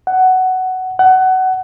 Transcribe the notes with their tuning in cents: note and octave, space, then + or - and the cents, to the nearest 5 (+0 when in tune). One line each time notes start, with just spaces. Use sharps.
F#5 +10
F#5 +20